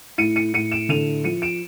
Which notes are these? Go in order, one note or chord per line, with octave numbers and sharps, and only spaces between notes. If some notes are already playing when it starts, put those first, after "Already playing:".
A2 C#7 D#7
C#7 D#7
A2 C#7 D#7
D7 E7
D3 D#7 F7
F3 C#7 D#7
D7 E7